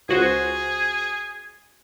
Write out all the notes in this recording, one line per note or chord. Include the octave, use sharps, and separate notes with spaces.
C#2 F#4 G#4 C5